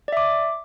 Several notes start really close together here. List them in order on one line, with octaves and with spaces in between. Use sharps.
D5 E5 D6